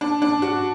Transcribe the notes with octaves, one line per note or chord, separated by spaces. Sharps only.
D4
D4
F#4